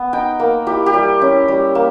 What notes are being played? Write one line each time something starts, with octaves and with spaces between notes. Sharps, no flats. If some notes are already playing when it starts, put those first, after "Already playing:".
Already playing: B3
D#4 G5
A#3
E4 G4
G4
G3
C#4 E4
G3
A#3